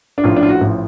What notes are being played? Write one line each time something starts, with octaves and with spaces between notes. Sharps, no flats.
D4
A1 A2 F3 F4
D4
F4
F#4
A1 A2 F3